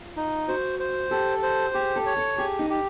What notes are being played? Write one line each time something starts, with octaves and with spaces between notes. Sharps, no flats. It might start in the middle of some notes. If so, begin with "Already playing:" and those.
Already playing: F4
D#4
F#4 C5
C5
G4 A4
C5
G4 G#4
A4
C#5
A4
G4 G#4
D#4
G4